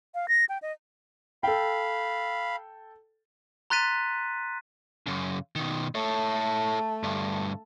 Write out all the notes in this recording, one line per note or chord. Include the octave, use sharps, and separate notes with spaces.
F5
A#6
G5
D#5
A4 F5 G5 B5
A#5 C6 F#6 A6 B6 D#7
F#2 C#3
B2 D#3
A3 A4 C#5
D2 G2